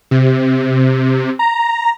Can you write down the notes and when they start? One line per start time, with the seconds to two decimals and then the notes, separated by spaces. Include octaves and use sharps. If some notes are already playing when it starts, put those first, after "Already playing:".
0.11 C3
1.39 A#5